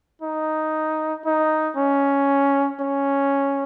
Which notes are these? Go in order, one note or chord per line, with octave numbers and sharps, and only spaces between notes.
D#4
D#4
C#4
C#4